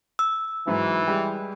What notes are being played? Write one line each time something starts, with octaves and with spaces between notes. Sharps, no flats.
E6
G#2 E3 F#3
G3 G#3 G4